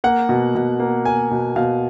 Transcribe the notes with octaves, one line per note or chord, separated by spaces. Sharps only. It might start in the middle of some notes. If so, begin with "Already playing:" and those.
A#3 F#5
B2
B2
A#3
A#3 G#5
B2
B2 F5